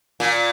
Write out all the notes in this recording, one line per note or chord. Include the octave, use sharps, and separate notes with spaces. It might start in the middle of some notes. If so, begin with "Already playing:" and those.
A#2